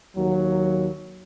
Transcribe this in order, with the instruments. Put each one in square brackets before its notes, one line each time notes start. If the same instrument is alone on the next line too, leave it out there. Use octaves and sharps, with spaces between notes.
[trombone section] D#2 F#3